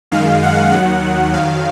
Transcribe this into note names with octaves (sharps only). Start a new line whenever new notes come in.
F#2 D#3 G#3 F5
F#5
D#2 D#3 F#3 F#5
F2 D#3 F#3 F5